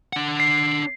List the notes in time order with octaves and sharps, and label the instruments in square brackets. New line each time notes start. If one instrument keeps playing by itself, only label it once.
[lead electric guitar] D4 F#5
[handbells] C7